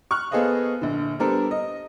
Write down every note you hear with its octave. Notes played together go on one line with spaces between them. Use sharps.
C#6 F6 F#6
B3 G#4 A4 C5 D#5 F5
A#1 D3
G3 B3 D4 A4 A#4 C5
D#5